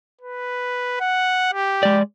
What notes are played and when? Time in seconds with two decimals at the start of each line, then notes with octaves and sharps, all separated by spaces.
0.21 B4
1.01 F#5
1.54 G4
1.83 G#3 D5